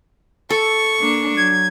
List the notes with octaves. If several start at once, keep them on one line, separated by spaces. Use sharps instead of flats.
A4 C#6
A#3 D4
F#3 G#6